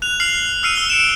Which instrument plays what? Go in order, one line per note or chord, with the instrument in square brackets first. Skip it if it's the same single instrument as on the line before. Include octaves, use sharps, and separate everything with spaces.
[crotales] F#6 F7
F6 C7 F7 F#7
E6 F6 C7 C#7 D#7
E6 G7
C#7 D7 E7